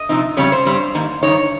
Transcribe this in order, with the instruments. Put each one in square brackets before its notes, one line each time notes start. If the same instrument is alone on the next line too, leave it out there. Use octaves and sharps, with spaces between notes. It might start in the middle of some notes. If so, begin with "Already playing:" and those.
Already playing: [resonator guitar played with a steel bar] D#5
C3 F3 C4 D#4
F2 C#3 G3 C#4 C#5
C5
G2 G3 C4
G#2 D#3 A#3
G2 D#3 A#3 D#4 C#5